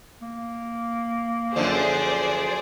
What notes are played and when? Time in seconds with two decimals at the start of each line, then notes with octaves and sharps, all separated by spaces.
0.22 A#3
1.56 F#2 D3 F3 G#4 C5 D5